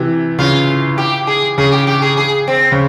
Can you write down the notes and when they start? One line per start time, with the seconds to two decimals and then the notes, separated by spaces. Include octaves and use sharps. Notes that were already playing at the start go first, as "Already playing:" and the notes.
Already playing: C3 E3
0.39 C#3 F4
0.98 G4
1.27 G#4
1.58 C#3 G#4
1.72 G4
1.87 G4
2.02 G#4
2.17 G#4
2.48 C4
2.72 C#3